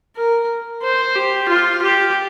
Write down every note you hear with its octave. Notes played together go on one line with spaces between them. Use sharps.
A#4
C5
G4
F4
G4